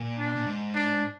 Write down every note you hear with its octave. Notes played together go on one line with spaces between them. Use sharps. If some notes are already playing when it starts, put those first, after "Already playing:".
Already playing: A#2
D4
A#2
G#2
D4